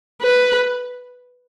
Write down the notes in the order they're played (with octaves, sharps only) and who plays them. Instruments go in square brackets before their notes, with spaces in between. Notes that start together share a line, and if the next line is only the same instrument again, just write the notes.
[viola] B4